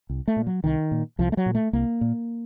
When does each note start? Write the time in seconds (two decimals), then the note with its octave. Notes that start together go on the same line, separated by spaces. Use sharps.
0.09 C2
0.28 A3
0.36 A#2
0.47 F#3
0.64 C2 D#3
0.91 A#2
1.19 C2 F3
1.32 A3
1.37 F#3
1.46 A#2
1.55 A3
1.73 C2 A#3
2.01 A#2